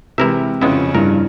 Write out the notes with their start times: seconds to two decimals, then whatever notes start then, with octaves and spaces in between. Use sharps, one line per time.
0.18 C3 E3 G#3 E4 A#4 E5
0.62 F2 C#3 G#3 B3 C#4 E4
0.95 G2 E4 A#4